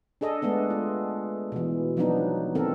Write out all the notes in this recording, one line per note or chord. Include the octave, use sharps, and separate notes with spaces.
D4 G#4 A4 D#5
G#3 A3 B3 D4
F4
B2 E3
F3 F#3 A#3 B3 D4 D#4
D#3 A#3 C4 A4 A#4